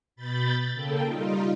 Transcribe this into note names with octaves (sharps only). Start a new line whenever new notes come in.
B2 B5 G6 A6
C#3 A#3 A4 G5
G3 D#4 F4